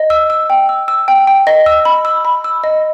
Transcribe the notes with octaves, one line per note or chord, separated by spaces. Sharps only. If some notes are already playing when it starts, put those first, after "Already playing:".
Already playing: D#5
E6
E6
G5
E6
E6
G5
G5
D#5
E6
B5
E6
B5
E6
D#5